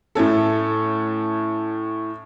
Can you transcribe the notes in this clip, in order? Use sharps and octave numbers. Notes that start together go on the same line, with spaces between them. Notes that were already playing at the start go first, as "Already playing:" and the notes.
A2 A3 C#4 A4